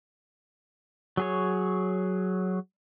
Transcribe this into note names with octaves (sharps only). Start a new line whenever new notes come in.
F#3 G#4 C#5